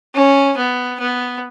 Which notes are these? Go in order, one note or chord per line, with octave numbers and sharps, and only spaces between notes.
C#4
B3
B3